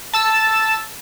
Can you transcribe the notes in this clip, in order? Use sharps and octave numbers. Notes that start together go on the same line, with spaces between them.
A5 E6